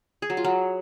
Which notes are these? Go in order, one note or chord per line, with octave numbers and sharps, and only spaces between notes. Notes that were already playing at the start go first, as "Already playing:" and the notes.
G#4
F#3
F4
F#3